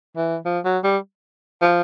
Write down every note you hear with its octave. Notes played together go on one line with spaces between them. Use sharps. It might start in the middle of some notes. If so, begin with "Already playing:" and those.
E3
F3
F#3
G3
F3